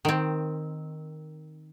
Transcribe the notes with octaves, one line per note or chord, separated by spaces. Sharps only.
D#3 C4